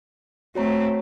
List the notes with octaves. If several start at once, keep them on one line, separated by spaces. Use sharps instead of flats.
A3 C4 F#4 C#5 A#5